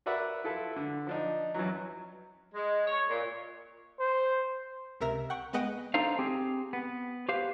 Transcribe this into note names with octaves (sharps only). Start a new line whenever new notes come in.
F#4 A#4 B4 D5 E5 F#5
E4 F4 A4 B4
D3
F3 D4 D#4
F#2 E3 F#3
G#3
C#5
A#2
C5
C#2 C3 A#4 E5 A#5 A#6
F#5 G5 C#6
G#3 B3 B4 D#5 F#5 G5
D4 D#4 A4 C5 F5
C4 G4 G#4
B3
G4 B4 C5 F5